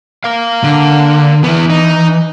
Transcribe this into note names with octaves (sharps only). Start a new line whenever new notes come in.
A#4 F5
D3
E3 B3 E4
D#4